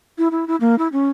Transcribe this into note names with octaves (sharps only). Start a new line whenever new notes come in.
E4
E4
E4
A#3
E4
C#4